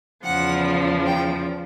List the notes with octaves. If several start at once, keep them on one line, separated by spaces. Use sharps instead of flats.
E2 C#3 F3 F#5
G5